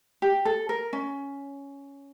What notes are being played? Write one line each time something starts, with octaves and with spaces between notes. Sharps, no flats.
G4
A4
A#4
C#4